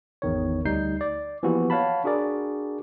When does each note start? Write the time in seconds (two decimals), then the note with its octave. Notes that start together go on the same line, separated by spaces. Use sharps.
0.22 G#1 E2 D#3 C#5
0.65 D2 G3 D#4 G6 C7
1.01 D5
1.43 E3 F3 A#3 B3 F#4 G4
1.70 C#5 F5 F#5 A5 B5
2.04 D4 F#4 G#4 A#4 D5